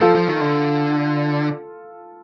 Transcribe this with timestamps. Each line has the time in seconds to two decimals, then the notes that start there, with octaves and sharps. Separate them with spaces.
0.01 F3 F4 A4
0.15 F3
0.28 D#3
0.41 D3